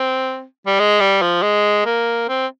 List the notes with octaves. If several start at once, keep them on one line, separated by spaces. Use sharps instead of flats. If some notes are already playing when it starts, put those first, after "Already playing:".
Already playing: C4
G3
G#3
G3
F3
G#3
A#3
C4